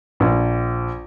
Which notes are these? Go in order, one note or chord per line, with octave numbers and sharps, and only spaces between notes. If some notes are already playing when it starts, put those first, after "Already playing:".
A#1